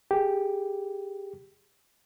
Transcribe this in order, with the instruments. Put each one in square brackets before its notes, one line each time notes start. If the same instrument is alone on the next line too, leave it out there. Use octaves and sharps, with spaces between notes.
[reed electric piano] G4 G#4